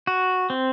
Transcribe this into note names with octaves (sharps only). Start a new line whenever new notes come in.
F#4
C4